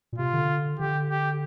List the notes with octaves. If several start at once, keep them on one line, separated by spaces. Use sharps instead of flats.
A#2
C3 F4
D3
D3 G4
G4